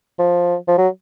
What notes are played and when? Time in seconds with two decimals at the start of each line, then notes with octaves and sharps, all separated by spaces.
0.19 F3
0.68 F3
0.78 F#3